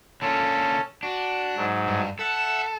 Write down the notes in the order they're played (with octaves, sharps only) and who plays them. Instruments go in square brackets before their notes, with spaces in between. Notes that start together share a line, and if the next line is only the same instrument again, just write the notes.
[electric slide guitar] D3 A#3 F4 [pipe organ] C#4 A4
[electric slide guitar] D4 [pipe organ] F#4
[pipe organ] G#2 F#3
[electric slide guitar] G2
[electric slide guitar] A4 [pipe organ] E5 F#5 E6